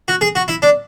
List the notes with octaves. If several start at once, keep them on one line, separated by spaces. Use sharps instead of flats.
F#4
G#4
F#4
E4
D4